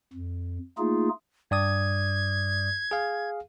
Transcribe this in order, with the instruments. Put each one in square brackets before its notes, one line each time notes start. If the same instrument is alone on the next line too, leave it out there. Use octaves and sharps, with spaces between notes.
[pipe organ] F2
A3 A#3 D#4 F4 G#4
[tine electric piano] G2 D5 D#6 [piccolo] G#6
[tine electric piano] G#4 F5